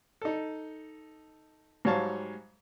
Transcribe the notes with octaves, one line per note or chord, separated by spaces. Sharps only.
D#4 A4
G#2 F#3 G3 C#5 F5 A5